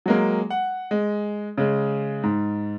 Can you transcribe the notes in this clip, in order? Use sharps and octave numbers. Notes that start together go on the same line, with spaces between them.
F#3 G#3 A#3
F#5
G#3
C#3 G#3
G#2